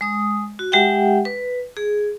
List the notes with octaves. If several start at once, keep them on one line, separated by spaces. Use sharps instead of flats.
G#3 D#6
F#4
G#3 G4 E5 F#5 G5
B4
G#4